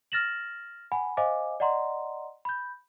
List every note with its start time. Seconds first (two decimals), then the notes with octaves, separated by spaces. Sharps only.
0.12 F6 A6 A#6 E7 F#7
0.92 F#5 G#5 B5
1.17 C5 D#5 F5 G#5 D6
1.60 D5 D#5 F#5 A#5 C6
2.45 B5 G6